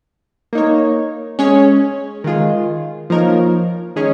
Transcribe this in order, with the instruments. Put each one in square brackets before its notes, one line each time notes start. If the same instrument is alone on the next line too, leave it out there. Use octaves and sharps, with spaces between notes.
[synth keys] A#3 D#4 C#5
G#3 C#4 G#4 C#5
D#3 G#3 F4 G#4
F3 A#3 D#4 A#4 C#5
D#3 G#3 C#4 G#4 C#5